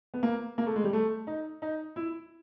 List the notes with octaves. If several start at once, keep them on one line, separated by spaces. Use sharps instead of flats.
B3
A#3
A#3
A3
G#3
G3
A3
D#4
D#4
E4